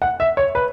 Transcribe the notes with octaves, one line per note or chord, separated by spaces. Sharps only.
F#5
E5
C#5
B4